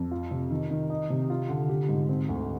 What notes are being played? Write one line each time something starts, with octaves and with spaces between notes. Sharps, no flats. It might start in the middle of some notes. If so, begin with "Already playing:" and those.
Already playing: F2
F4
C3
D#3
D#3
D#4
C3
F4
D3
G4
G#2
C4
D2